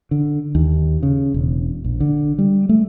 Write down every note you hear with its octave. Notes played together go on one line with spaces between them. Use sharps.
D3
D#2
C#3
E1
A#1
D3
G3
A3